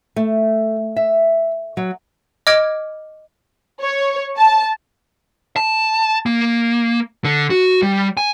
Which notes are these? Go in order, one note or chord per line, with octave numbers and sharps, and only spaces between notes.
A3
E5
F#3
D#5 D6 F6 G#6 D7
C#5
A5
A5
A#3
D3
F#4
G3
G#5